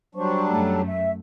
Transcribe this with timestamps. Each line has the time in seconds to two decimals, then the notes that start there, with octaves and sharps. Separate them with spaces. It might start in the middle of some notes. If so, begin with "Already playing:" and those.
0.15 F#3 G3 D4 C5 C#6
0.49 F#2 A3 A4
0.87 E5